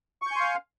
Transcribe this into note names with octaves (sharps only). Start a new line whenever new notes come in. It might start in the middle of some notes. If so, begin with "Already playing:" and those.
F5 G#5 C6 C#6 G6